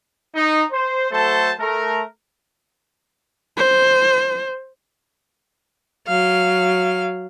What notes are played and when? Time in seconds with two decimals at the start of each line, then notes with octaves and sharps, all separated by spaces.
0.34 D#4
0.71 C5
1.11 F#3 A3 A4 C5 A5
1.59 A3 A#4
3.57 C5
6.08 F#3 F5